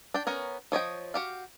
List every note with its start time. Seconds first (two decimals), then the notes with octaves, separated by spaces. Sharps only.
0.14 D4 G5
0.27 B3 C#4 A#4 C#5
0.72 F3 C#5 D#5 G5
1.14 F#4 G4 F5